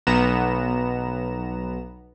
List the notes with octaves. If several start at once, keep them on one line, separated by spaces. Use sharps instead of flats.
B1 B3 A#5 E7